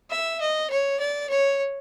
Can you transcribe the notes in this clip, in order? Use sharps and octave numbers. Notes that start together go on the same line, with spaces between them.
E5
D#5
C#5
D5
C#5